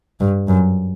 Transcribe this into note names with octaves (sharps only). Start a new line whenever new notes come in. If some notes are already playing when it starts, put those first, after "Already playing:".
G2
F#2